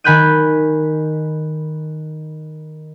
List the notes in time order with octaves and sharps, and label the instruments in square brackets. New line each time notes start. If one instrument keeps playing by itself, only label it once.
[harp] D#3 G#5 B5 F#6 G6 D#7